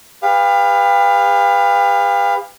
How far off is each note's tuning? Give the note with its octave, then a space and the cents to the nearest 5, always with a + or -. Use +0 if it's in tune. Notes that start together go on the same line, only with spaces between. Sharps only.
G4 +40 B4 +0 F5 +0